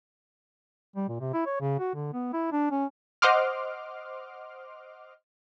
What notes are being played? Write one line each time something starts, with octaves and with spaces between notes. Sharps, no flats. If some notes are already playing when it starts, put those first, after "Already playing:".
G3
A#2
C3
E4
C#5
C#3
F#4
D3
B3
E4
D4
C#4
C5 D#5 F#5 C6 D6 F6